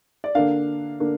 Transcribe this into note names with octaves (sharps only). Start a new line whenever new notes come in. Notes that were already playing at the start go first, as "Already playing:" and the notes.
D5
D3 A#3 D4 F5
D3 A#3 D4